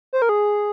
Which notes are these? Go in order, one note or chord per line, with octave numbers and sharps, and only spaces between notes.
C5
A#4
G#4